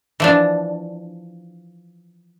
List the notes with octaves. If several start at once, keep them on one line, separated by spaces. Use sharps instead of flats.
E3 F3 D4